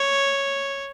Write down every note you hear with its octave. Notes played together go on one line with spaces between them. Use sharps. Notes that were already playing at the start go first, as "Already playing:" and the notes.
Already playing: C#5